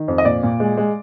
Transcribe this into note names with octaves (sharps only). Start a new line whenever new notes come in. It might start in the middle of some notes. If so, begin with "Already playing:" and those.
Already playing: D#3
F2
D#5
A#2 D5
A#2
G#3
G#3